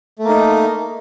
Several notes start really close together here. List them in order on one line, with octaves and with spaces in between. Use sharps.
A3 A#3 D#4